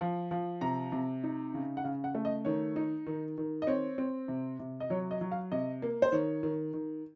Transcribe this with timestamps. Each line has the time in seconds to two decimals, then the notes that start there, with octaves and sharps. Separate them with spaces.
0.01 F3
0.31 F3
0.61 C3 A#5
0.92 C3
1.24 D#4
1.54 C#3
1.77 F#5
1.84 C#3 F5
2.04 F#5
2.15 A3
2.25 D#5
2.45 D#3 C#5
2.76 D#4
3.07 D#3
3.38 D#3
3.62 D#5
3.67 C4 C#5
3.98 C4
4.28 C3
4.60 C3
4.80 D#5
4.90 F#3 C#5
5.11 D#5
5.21 F#3
5.32 F5
5.52 C3 D#5
5.82 A#3
6.02 C5
6.12 D#3 C#5
6.43 D#3
6.74 D#3